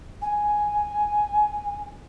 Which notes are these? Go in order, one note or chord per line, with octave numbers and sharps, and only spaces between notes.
G#5